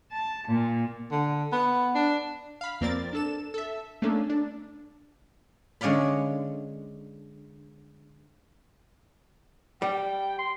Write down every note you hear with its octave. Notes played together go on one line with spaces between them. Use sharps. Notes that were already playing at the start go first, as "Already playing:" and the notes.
A5
A#2
D3
B3
D4
F5 B5
F2 A#3 C4 A#4 D5 A6
D4 A4 E7
A4 E5
A3 A#3 C#4 D4 A4
D4
D3 G#3 C#4 D5 F5 B5
G3 G5
C6